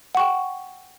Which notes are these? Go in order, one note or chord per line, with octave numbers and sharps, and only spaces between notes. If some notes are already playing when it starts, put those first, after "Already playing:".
F#5 G5 C#6